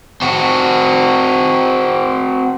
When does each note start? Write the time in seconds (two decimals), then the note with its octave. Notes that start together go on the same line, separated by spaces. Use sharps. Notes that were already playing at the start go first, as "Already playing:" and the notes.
0.22 C4 F#4